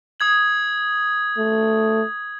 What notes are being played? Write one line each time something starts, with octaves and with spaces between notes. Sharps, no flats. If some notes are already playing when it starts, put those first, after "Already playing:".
D#6 G#6 F#7
A3